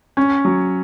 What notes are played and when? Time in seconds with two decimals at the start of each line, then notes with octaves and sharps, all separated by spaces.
0.17 C#4
0.45 F#3